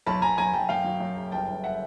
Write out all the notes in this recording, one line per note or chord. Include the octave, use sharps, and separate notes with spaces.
B1 A5 B5
B1 G#5 A#5
B1 G#5 A#5
B1 G5 A5
F#2 F5 G5
F#3
F#2
F#1
G1 G5 A5
G1
E5 F#5